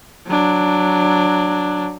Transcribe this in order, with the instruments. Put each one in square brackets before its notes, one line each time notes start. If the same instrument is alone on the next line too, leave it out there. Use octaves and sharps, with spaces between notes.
[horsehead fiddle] F#3 D4